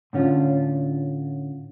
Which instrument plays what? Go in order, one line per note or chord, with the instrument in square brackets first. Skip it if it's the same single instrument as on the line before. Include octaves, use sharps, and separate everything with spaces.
[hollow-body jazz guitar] A2 D3 C#4 F4